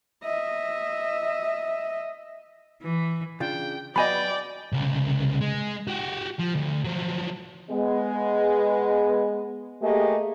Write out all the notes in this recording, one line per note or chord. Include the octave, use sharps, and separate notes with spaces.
D#5 E5
E3
C#3 D4 F4 G5
F#3 B3 F#4 D5 D#5 G5 G#5 B5
C2 C#3
G#3
F#4 G4
F3
D2
F3 F#3
G#3 B3
A3 A#3 G4 G#4 D#5